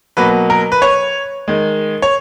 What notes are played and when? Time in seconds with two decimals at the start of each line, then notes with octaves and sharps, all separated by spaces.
0.17 B2 F#3 A#3 B4
0.50 A#4
0.72 B4
0.82 C#5
1.48 D#3 G#3
2.02 C#5